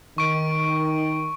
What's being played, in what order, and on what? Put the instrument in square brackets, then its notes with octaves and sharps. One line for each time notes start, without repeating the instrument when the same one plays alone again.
[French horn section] D#3 [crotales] C#6 D7